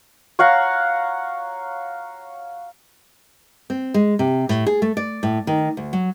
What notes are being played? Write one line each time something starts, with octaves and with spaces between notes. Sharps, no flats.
C#5 F5 F#5 A#5
C4
G#3
C3
A2
G#4
A3
D5
A2
D#3
D2
F#3